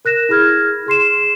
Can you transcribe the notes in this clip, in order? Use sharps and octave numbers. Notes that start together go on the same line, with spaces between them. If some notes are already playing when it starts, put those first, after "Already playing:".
A#4 F#6 A#6 E7
E4 G#4 B5 F6 G#6
G#4 C6 C7 E7